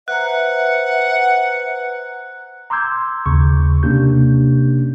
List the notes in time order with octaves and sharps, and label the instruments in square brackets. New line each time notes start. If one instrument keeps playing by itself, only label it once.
[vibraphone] B4 C5 A#5 [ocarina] E5 [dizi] F#5 [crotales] F#6
[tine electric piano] A#5 C6 D6 E6 G6 G#6
D#2 C#3 C#6
C3 A#3 C#4 D4 G4 G6